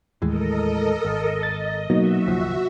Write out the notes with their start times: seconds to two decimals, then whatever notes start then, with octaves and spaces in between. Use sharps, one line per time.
0.22 D#2 A2 E3 G#3 A4 A#4 D#5
1.05 G#1
1.43 D#5 A6
1.90 B2 F#3 A#3 D#4 F#4 E5
2.26 G1 C2 F3